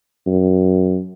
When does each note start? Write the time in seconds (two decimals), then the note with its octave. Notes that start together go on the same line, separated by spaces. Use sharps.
0.27 F#2